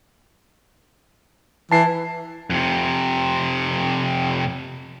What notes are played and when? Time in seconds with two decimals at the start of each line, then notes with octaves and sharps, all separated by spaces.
1.71 E3 A5 C7
2.50 F2 C3